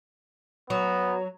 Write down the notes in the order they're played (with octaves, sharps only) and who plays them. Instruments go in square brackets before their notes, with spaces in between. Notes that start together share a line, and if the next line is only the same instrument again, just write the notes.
[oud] F#3 [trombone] B3